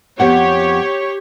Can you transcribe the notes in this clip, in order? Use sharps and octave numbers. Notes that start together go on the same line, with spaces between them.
F2 B3 G4 C#5 F#5